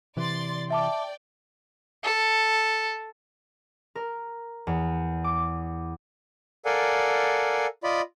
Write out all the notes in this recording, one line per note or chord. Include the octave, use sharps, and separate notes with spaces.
C3 E3 D5 C6 A6
D5 E5 G5 A5 D6
A4
A#4
E2
D6
A4 A#4 D5 F5 F#5 G#5
F4 D5 D#5 B5